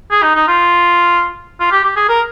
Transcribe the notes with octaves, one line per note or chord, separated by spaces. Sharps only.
G#4
D#4
D#4
F4
F4
G4
G4
G#4
A#4